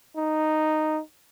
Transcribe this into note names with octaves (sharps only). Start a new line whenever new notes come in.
D#4